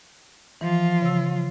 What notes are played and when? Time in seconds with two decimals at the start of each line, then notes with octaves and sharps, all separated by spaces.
0.61 E3 F3 F4
1.02 C#3 E6